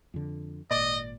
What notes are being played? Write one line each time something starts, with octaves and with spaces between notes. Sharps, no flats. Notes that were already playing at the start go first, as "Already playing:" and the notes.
F2 D3
G#1 A#2 D5 D#5